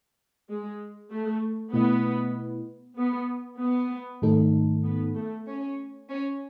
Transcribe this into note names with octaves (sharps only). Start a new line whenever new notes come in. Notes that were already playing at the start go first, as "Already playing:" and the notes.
G#3
A3
B2 A3 B3 E4 B4 D#5
B3
B3
G#2 D#3 A3 D#4 A4
B3
A3
C#4
C#4